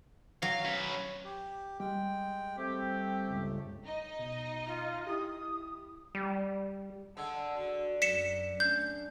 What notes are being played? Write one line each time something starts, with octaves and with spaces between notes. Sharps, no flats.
F#3 F5
C#4 B4
G4
G3 G#3 G5
A3 C4 G4
G1 C#2
D#4 D#5
B2
F4
E4 G4 D#6
G3
D3 G#3 F#5 A5 E6
D3 F#4
F#2 F#3 B6 C#7 E7
A3 C#4 D4 G6